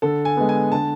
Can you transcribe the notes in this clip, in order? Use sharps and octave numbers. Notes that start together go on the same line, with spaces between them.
D3 A4
G#5
G#3 B3
G#5
D3 A5